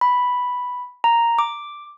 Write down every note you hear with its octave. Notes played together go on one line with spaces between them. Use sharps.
B5
A#5
D6